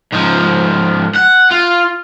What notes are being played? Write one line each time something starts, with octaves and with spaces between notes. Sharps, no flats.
G#2 F3
F#5
F4